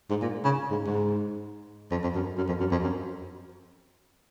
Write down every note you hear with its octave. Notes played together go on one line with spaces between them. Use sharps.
G#2
A#2
C#3
G#2
G#2
F2
F2
F#2
F#2
F2
F#2
F2
F#2